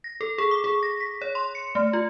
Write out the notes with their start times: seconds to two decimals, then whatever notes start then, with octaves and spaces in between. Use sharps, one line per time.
0.04 A#6
0.21 A4
0.38 G#4
0.51 D6
0.64 G#4
0.83 A#6
1.01 B6
1.21 C#5
1.35 C6
1.55 C#7
1.75 A3
1.93 F4